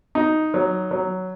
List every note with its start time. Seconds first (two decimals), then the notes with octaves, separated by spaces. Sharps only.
0.15 D#4
0.54 F#3
0.91 F#3